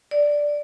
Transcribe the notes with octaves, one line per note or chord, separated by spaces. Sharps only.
D5